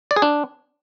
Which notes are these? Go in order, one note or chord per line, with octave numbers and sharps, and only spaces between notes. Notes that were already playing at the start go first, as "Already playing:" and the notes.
D5
G#4
D4